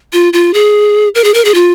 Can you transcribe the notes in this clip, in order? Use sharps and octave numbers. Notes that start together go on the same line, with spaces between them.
F4
F4
G#4
A#4
G#4
A#4
G#4
F4